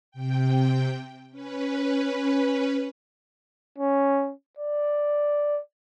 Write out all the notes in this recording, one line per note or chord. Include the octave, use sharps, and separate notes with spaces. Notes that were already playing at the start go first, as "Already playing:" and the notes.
C3 G5
C#4 B4
C#4
D5